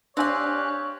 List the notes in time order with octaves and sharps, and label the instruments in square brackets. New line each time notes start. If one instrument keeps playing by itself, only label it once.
[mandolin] C4 F5 [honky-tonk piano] D4 G#5 [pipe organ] G4 F#6 [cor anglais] C#5